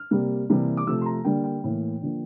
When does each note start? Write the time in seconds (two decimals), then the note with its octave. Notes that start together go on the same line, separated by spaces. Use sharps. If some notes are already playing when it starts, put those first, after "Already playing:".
Already playing: F6
0.11 C3 G3 A#3
0.50 C3 E3 G3 A#3
0.77 D6
0.87 C3 F3 A3 E6
1.02 C6
1.06 A#5
1.25 D3 G3 A#3 G5
1.44 G5
1.64 A2 E3 A#3
2.01 D3 F3 A#3